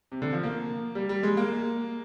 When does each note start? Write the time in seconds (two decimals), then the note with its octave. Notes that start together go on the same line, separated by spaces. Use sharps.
0.12 C3
0.22 D3
0.33 F3
0.43 A#3
0.95 G3
1.09 G3
1.23 G#3
1.37 A#3